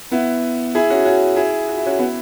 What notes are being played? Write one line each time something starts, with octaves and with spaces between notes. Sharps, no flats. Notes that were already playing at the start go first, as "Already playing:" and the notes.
B3 E4
E4 G#4
C#4 F#4
C#4 F#4
E4 G#4
F#4
E4
C#4 F#4
B3 E4